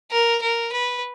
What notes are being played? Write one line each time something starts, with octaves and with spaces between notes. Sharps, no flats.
A#4
A#4
B4